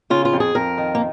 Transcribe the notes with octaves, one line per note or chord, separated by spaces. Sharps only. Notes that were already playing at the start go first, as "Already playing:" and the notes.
C#3 F4
F4
F2
G#4
F2 A#4
D#3
A#3